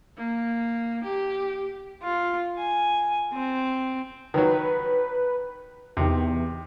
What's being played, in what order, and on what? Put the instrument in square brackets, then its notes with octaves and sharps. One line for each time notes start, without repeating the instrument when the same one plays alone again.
[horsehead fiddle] A#3
G4
[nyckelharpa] F4
G#5
C4
[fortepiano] D#3 F#3 [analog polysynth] B4
[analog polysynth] E2 [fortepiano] C3 D#3